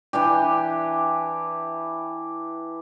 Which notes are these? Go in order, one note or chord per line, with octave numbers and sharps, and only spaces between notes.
E3 D4 G4